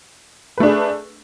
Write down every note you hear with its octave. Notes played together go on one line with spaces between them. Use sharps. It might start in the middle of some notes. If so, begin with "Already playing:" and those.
A3 D4 G#4 B4